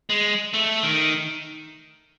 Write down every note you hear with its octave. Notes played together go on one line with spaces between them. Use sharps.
G#3
A3
D#3